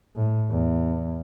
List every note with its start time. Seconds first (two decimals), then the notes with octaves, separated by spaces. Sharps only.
0.16 A2
0.51 E2